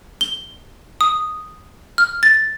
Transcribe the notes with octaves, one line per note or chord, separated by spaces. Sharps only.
G7
D#6
F6
A6